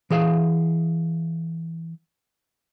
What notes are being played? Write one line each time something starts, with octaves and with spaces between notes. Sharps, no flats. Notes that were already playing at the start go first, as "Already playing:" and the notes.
E3 G#4 F5